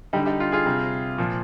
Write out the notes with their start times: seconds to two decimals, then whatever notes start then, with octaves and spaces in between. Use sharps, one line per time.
0.13 D3 G3 D#4 G4
0.26 D#4 G4
0.40 F4
0.52 F4 G#4
0.66 C3 G3
1.18 A#2 F3